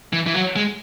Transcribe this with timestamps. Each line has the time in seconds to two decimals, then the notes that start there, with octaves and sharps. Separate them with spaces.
0.13 E3
0.27 E3
0.34 F#3
0.56 G#3